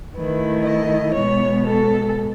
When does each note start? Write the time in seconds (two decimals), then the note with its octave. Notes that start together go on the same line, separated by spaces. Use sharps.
0.16 D#3 A3 E4 B4
0.65 D#5
1.15 B2 G#3 B3 C#5
1.65 A4